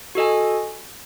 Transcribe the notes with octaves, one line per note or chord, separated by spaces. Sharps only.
F#4 A4 D#5 G#5